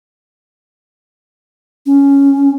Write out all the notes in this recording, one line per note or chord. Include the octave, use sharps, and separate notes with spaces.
C#4